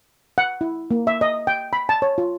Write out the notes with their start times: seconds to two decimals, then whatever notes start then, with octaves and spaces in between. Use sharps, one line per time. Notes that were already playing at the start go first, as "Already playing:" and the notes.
0.38 F#5
0.61 E4
0.91 A#3
1.07 E5
1.21 D#5
1.47 G5
1.73 B5
1.89 A5
2.02 C#5
2.18 F4